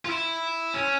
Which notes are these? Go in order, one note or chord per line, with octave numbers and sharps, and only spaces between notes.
F4
E4
C#4